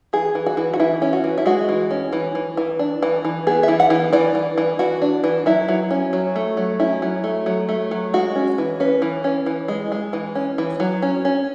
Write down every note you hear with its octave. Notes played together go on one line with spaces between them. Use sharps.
E3 G#4
E3
F#4
E3
F#4
E3 E4
C#4
F#4
E3
E4
G#3 F#4
E3
C#4
E3
E3
E3
D4
E3
E3
B3 G#4
E3 E5
F#5
E3
E3 D5
E3
E3
E3 F#4
D4
E3
F#3 E4
F#3
C#4
F#3
A3
F#3
C#4 E4
F#3
A3
F#3
A3
F#3
G#3 F#4
C#4
E3
C#4 B4
E3
C#4
E3
G#3
G#3
E3
C#4
E3
F#3
C#4
C#4